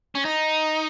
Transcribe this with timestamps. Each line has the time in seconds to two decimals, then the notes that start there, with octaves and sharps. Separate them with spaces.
0.15 C#4
0.25 D#4